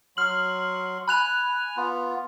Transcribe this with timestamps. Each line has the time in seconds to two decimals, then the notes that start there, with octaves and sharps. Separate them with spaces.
0.17 F#3 C6 F6 F#7
1.08 G#5 B5 F#6 F7
1.77 B3 F4